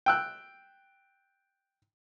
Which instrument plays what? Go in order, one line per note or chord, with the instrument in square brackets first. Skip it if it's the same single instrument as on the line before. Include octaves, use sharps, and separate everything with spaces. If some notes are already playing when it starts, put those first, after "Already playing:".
[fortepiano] G5 E6 F#6